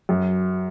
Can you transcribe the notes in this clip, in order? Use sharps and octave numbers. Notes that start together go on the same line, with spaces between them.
F#2